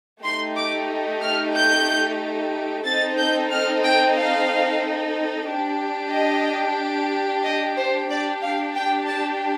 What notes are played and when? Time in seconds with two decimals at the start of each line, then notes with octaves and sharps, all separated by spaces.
0.23 A3 D#4 G4 C6
0.56 D6
1.22 F6
1.54 G6
2.86 C4 D#4 A4 A6
3.19 G6
3.51 F6
3.84 G5
4.17 F5
5.47 D4 G4
6.13 D#5
7.44 D#5
7.77 C5
8.10 D4 G4 D5
8.42 F5
8.75 G5
9.08 A5